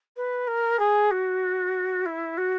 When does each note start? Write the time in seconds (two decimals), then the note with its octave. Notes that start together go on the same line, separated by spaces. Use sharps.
0.16 B4
0.47 A#4
0.79 G#4
1.11 F#4
2.06 E4
2.37 F#4